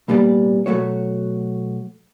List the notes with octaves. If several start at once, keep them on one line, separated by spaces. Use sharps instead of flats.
C2 A#2 G3 B3 A4 D5
B2 F#3 A3 F#4 C#5